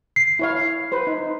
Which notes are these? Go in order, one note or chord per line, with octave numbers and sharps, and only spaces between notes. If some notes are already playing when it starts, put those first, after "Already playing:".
C7
E4 C#5 F5
B4 C5
D#4